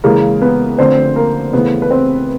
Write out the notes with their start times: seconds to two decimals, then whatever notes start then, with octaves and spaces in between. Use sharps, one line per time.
0.04 C#3 E3 G#3 A#3 A#4
0.41 B3 B4
0.78 D3 F3 A3 C4 C5
1.16 A#3 A#4
1.53 C#3 E3 A3 B3 B4
1.82 B4
1.90 C4 C5